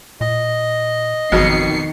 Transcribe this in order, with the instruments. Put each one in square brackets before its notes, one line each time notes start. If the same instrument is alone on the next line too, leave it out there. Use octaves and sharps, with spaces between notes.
[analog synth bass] A#2 [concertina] D#5
[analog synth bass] G#1 [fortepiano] F2 B2 F#3 [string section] D#3 C7 C#7